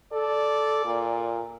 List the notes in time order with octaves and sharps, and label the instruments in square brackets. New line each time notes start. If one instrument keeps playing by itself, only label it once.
[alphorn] A4 [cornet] D5
[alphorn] A#2